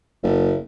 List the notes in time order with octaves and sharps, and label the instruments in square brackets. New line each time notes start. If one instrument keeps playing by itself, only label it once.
[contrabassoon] F#1